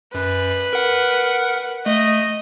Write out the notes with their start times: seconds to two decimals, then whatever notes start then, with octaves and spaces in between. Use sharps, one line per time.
0.15 F#2 B4
0.73 A#4 F#5
1.86 A3 D#5